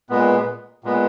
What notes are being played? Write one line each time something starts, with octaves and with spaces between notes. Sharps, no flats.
A#2 G#3 B3
A#2 G#3 B3